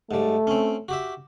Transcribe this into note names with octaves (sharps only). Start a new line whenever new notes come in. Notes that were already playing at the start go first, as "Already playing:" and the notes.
G#2 G3 A3
C4 C#4
F#4 G4 E5